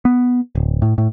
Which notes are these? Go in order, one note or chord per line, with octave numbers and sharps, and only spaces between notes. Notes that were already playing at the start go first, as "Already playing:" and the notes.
B3
D1
A2
A2